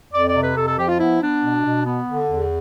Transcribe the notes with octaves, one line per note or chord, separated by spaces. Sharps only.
F2 D5
D5
C3
B4
F2 A4
A4
F3 G4
F4
B3 E4
B3 D4
B2
B2
B3
D3
E2